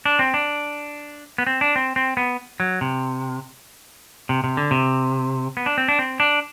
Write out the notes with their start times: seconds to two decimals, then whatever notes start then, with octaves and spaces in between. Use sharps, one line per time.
0.05 D4
0.19 C4
0.34 D4
1.38 B3
1.47 C4
1.61 D4
1.76 C4
1.96 C4
2.17 B3
2.60 F#3
2.81 C3
4.29 C3
4.44 C3
4.57 D3
4.71 C3
5.57 B3
5.66 D4
5.78 C4
5.88 D4
5.99 C4
6.20 D4